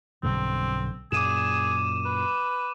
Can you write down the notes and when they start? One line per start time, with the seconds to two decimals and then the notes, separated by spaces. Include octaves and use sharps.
0.23 B1 G2 D3 C4
1.12 F#2 A#2 G#4 D6 D#7 E7
2.05 B4